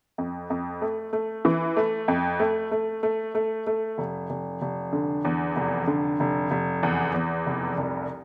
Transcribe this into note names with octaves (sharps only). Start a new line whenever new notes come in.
F2
F2
A3
A3
E3
A3
F2
A3
A3
A3
A3
A3
F1
F1
F1
D3
E2
F1
D3
F1
F1
E2
E2
F1
C2